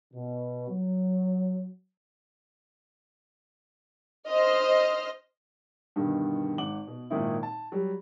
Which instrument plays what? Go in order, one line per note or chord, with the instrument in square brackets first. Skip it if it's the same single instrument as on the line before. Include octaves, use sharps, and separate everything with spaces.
[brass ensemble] B2
F#3
[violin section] C5 D#5 F6
[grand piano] G2 B2 D3 D#3
G#1 F#5 D6 F#7
B2
G#1 A#2 D#3 D#4 E4
A5
F#3 G3